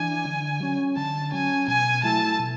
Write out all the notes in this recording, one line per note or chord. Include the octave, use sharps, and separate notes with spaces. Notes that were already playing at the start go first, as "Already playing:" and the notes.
Already playing: E3 D4 G#5
D3
F#3 C#4
D3 A5
F#3 C#4 G#5
B2 G#5
F#3 A3 E4 A5
B2